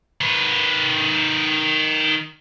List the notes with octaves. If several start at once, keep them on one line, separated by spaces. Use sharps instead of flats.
D#3 B4